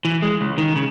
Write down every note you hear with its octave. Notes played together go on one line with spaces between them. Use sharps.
E3
G#3
C#2
D#3
C#3